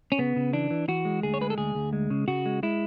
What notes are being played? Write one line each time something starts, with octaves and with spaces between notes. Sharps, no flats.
C#4
C#3 B3
C#3
E3 D4
E3
E3 F#4
G#3
D2 G#4
C#5
G#3 B4
A4
D2 G#4
D2
G#3
C#3
C#3 F#4
G#3
G#3 E4